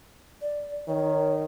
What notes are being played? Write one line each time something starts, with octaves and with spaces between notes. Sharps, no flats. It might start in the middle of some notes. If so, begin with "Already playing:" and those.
D5
D#3 C#5